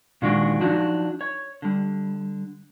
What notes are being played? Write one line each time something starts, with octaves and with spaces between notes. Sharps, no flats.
A#2 D#3 F#3 G#3 D4 F#4
F3 F#3 D4 D#4 F#4
C#5
D3 G3